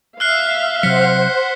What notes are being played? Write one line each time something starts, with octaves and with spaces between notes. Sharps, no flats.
E5 F5 F6 F#6 C7
C3 F#3 C5 F#5 B6 C#7